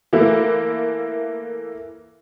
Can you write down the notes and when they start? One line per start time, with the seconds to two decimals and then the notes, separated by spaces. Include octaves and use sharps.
0.13 E3 A3 A#3 E4